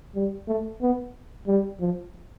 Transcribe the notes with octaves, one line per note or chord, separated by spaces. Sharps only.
G3
A3
B3
G3
F3